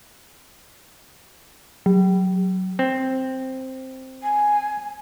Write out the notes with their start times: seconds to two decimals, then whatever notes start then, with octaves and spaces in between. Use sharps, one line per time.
1.86 F#3
2.79 C4
4.22 G#5